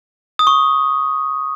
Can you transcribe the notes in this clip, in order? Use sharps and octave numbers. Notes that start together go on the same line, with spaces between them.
D#6
C#6